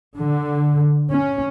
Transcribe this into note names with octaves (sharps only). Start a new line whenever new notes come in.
D3
C#4